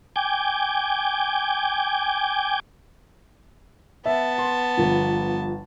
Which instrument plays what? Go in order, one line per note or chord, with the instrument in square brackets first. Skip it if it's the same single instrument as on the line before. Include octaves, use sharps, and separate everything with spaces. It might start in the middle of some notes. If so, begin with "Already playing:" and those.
[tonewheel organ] G5 G#5 D6
[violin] B3 A5 [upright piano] E5
[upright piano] C6
G1 F3